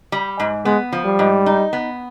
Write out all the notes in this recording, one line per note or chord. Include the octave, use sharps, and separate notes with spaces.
G3
G#2
G#3 B3
F3
G3
G#2
D#4
B3